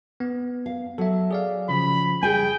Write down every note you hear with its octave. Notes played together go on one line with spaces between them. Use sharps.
B3
F5
F#3 A4 E5
G#4 D5 F5
C#3 F3 B5
G3 G#4 G5 G#5